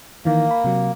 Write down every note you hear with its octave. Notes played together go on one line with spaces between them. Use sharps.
D#3 E3 A#3
B5
C3 F#3